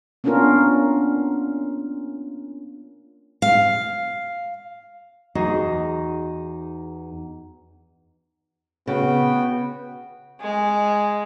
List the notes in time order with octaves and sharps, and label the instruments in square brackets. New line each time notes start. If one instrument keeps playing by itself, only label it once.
[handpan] A#3 B3 C#4 D4 F4 A#4
[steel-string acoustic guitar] F5
[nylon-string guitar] E2 D#4 F#4 G#4 D#5
[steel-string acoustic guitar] C#3 [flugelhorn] B3 [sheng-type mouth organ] F#4 G5
[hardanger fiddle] G#3